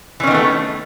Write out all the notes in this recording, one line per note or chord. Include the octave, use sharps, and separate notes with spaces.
D#3 E3 A3 B3 C#4